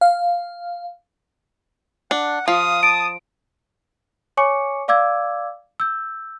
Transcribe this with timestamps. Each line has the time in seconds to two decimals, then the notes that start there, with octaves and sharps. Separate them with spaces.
0.01 F5
2.11 D4 F#5
2.48 F3 F5 D#6
2.83 A5 D7
4.37 C#5 G#5 C#6 D6 C#7
4.88 D5 F5 D6 E6 G#6
5.80 E6 G6